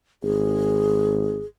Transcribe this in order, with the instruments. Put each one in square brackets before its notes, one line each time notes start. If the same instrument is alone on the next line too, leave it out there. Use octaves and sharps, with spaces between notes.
[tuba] G#1 [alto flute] G#4